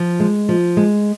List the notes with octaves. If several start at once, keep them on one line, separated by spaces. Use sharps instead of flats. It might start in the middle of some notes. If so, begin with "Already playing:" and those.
Already playing: F3
G#3
F3
G#3